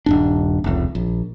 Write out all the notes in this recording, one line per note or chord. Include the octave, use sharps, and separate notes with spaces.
D#1 G2 D4
F1 C#2
A#1